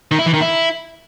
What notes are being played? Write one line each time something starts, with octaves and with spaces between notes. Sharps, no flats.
D#3
E4
E3
D#3
E4